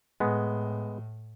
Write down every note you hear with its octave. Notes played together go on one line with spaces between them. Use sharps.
A2 G#3 B3